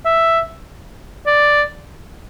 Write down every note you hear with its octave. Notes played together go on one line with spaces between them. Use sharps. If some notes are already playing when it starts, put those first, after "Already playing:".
E5
D5